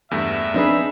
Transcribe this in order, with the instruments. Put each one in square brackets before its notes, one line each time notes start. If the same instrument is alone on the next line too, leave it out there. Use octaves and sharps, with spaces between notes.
[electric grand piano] E2 G2 A3 [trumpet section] E5
[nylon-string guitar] C4 D4 B4 [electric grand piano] D#4 G#4